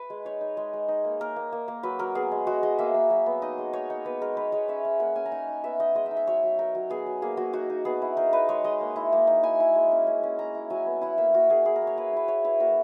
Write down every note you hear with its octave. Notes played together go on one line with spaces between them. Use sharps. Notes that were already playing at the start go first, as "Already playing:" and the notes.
Already playing: B4
G#3
D#4 C#5
D#4
G#3
G#3
D#4
A#3
A#3 A#4
A#3
A#3
A#3
F#3 B4
F#3 A#4
B3 G#4
G#3
G#3 F#4
G#3 D#5
A#3 E5
A#3
F#3
B3
D#4 D#5
G#3
D#4 C#5
D#4
B3 B4
G#3 A#4
D#4 B4
G#3 C#5
C#4 E5
C#4
A#3 F#5
C#4 G#5
A#5
D#4 G#5
D#4
B3 E5
D#4 D#5
G#3 D#5
E5
D#4
E5
F#3 C#5
F#3
D#4 A#4
F#3
B3 G#4
F#3
A#3 G#4
A#3 F#4
D#4 F#4
D#4
B3 G#4
E4
D#4 A#4
D#4 B4
G#3 C#5
G#3 D#5
A#3
E4
A#3
D#4
E4 G#5
E4
G#3
C#4
C#4
C#4
C#4 A#5
E4
F#3 G#5
B3
E4 F#5
A#3 E5
A#3 F#4
A#3 G#4
E4 G#4
A#4
A#3
C#5
E4 B4
E4 B4
E4 C#5
E4 B4
A#3 F#4